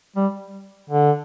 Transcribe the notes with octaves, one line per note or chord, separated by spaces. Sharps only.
G3
D3